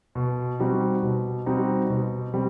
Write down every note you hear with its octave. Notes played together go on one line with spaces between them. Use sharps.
B2
G3 C4 D#4 F#4
B2
G3 C4 D#4 F#4
B2
G3 C4